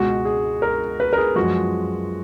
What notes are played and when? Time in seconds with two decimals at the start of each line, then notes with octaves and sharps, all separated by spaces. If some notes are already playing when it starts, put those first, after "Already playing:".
Already playing: C#2 B2 G#3 F#4
0.25 G#4
0.62 A#4
1.00 B4
1.13 A#4
1.17 G#4
1.36 F#2 F3 G#3 F#4